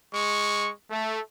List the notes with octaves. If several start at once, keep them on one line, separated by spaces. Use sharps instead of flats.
G#3 C#6
A3